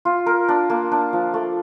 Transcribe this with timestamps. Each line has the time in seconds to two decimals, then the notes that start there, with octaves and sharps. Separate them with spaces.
0.05 F4
0.26 A#4
0.48 D4
0.70 A#3
0.92 D4
1.13 F3
1.34 A3